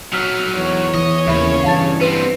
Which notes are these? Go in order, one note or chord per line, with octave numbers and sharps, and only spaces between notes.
F#3 D#4 E6 F6 B6
E2 C#5
E3 D#5
D#2 C#3 E3 A#3 E5 B5
G2 E3 F5 A5 A6
B3 C4 B4